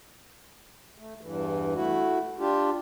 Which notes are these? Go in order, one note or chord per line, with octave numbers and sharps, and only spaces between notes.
A3
E2 G2 E3
A3 E4 F#4
D4 F4 G4